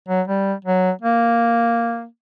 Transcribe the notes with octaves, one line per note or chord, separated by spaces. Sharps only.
F#3
G3
F#3
A#3